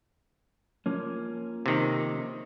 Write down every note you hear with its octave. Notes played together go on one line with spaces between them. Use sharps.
F3 A#3 C#4
C3 D#3